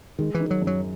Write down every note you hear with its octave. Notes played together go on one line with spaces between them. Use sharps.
D#3 G#3
E3
D#3
F#3
F#2
F#3